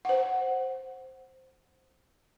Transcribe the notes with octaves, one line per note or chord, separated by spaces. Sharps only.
C5 F#5